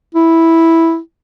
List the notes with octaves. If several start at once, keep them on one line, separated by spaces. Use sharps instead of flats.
E4